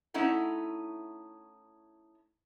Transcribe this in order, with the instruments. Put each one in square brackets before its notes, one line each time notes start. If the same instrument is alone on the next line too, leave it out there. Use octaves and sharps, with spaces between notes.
[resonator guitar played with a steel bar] A3 C#4 D#4 E4 F#5